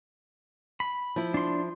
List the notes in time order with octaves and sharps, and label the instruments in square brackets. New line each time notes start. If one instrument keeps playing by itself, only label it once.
[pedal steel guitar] B5
[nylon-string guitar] F3 E4
[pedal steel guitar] D4 C6